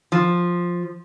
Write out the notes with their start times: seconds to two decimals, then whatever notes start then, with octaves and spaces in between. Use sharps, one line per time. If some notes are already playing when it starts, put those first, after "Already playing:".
0.12 F3